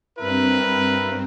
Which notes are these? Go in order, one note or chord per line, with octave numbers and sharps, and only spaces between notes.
G2 C4 E4 A#4 B4